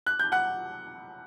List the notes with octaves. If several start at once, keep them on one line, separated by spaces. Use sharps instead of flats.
F#6
G6
F#5 F#6